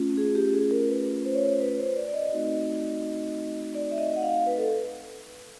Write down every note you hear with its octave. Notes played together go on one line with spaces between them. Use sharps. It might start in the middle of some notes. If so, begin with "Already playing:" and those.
Already playing: A3 C#4 F4
G#4
G4
G#4
A#4
B4
C5
C#5
C5
B4
C5
D5
D5
D#5
A3 C4 D#4 F#4
D5
E5
D#5
F#5
F5
B4
A4